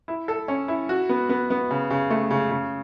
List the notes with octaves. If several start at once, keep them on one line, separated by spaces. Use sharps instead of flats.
E4
A4
C#4
E4
F#4
B3
B3
B3
C#3
C#3
A3
C#3
C#3